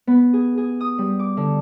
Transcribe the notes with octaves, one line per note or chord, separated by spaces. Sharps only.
B3
G#4
G#4
D#6
G3
D6
D3